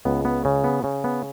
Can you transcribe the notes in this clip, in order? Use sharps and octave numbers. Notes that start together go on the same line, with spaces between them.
C#2 B3
B3
C#3
B3
C#3
B3